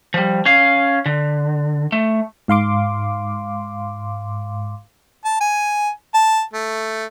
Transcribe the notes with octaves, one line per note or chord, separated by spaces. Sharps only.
F3 G3
C#4 F5
D3
A3
G#2 F5 C6 D6
A5
G#5
A5
A3